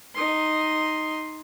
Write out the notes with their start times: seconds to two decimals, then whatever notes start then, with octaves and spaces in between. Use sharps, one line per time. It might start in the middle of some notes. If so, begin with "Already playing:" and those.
0.15 D#4 C6